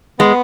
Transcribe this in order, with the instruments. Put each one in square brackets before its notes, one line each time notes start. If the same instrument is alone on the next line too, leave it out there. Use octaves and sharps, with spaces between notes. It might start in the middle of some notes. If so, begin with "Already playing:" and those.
[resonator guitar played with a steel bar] G#3 [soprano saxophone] B3